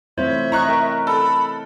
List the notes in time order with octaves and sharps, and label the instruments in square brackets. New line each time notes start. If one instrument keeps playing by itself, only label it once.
[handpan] A3 C4 E4 [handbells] F4 C5 C#5 [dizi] E5
[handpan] E4 D#5 [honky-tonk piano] A#5 C#6 F#6
[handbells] A#4 G5 [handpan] C#5
[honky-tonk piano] A4 [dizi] B5